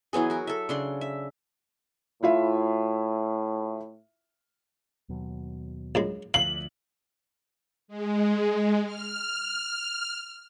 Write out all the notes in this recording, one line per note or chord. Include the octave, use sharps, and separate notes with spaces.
E3 F#3 B3 G#4
F#4 A#4
A4 E5
C#3 D4 C6
E5
A2 E4 F4 E5
D#2 B2 F#3
A#1 F#2 G#3
D2 F3 F5 F#7
G#3
F6